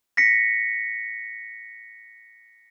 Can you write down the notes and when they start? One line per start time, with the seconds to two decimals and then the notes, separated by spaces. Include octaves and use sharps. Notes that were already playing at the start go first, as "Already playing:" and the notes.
0.17 A#6 B6 C#7